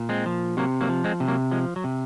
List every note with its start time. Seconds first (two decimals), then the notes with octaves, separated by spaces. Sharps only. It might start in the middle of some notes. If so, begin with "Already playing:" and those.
Already playing: A#2
0.09 G#3 C4
0.26 F3
0.57 C3 F#3 A#3
0.81 F#3 A#3
0.89 F3
1.04 G#3 C4
1.20 C3
1.28 F#3 A#3
1.51 F3 G#3
1.76 F#3
1.84 C3